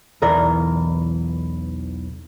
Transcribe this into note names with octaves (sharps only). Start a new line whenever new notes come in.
B1 E2 E3 A#4 D5